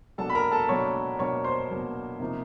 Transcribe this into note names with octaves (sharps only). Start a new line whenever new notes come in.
B2 F#3 A#3 D4 A4 A5
B5
A#4 A#5
A4 A5
B2 F#3 A#3 D4 C#5 C#6
B2 F#3 A#3 D4 C#5 C#6
C5 C6
B2 F#3 A#3 D4
C3 F3 A#3 D#4